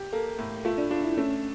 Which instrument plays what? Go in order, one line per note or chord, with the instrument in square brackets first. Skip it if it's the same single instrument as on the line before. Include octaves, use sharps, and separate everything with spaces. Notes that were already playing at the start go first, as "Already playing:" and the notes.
Already playing: [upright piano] G4
[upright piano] A#3 [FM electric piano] A4
[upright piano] A2
[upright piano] A3 [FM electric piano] F4
[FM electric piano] D4
[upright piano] D4 [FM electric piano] F4
[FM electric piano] E4
[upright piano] A3 [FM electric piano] C#4